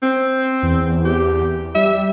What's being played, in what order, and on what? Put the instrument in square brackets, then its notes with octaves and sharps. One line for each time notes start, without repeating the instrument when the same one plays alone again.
[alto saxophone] C4
[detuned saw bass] E2
[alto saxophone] G4
[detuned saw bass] G3 [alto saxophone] E5